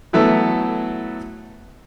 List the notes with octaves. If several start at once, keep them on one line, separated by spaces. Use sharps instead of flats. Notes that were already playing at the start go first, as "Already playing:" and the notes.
E3 F#3 A3 B3 E4 A4